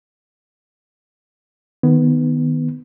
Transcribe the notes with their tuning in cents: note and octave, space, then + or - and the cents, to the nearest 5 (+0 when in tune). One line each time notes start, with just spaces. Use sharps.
D#3 +0 B3 +0